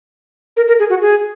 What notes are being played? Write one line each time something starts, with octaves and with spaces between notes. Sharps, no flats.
A#4
A#4
G#4
F#4
G#4